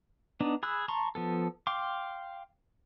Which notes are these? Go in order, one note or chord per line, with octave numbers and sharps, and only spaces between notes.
B3 D4 D#4
G#4 B5 E6 F#6
A5 A#5 C6 C#6
F3 B3 A4
F5 G5 C6 D6